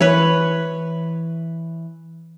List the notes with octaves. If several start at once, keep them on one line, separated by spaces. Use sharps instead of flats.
E3 B4 C#5